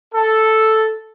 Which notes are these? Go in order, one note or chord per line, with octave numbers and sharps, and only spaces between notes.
A4